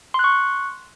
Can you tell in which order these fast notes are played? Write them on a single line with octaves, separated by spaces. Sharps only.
C6 F#6 C#6